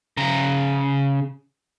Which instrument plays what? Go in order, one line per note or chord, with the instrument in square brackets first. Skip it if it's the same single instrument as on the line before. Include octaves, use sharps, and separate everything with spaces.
[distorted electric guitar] C#3 A#5